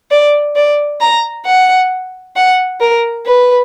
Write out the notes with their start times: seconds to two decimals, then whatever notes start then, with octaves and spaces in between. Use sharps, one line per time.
0.11 D5
0.56 D5
1.01 A#5
1.46 F#5
2.36 F#5
2.80 A#4
3.26 B4